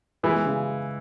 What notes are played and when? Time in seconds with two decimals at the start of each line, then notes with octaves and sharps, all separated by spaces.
0.23 E3 G#3
0.46 C#3